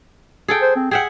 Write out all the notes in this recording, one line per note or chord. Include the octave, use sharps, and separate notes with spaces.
G#4 A4 G5
C5
C4
G#4 E5 F#5 G5